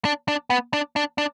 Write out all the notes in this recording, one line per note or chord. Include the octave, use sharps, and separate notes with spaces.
D4
D4
B3
D4
D4
D4